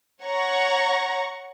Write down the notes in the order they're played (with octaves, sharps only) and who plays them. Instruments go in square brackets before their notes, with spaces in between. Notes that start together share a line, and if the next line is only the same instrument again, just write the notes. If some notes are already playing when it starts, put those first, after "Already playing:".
[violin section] C#5 F#5 A#5 C#6